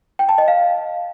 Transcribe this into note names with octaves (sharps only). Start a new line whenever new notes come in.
G5
A5
D#5
F5